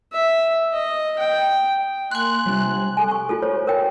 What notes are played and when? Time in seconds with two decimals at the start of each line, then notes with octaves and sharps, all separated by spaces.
0.12 E5
0.72 D#5
1.18 G5
2.12 A#3 G#5 C6 F#6
2.46 C3 G3 D4
2.97 A4 G#5
3.11 C#6
3.29 F4 F#4 A4
3.42 A4 C5 C#5
3.67 A#4 C#5 G5